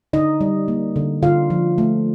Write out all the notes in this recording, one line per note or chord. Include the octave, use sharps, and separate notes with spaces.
D3 D#4 D#5
G3
A#3
D3
D3 F4 F5
F3
A3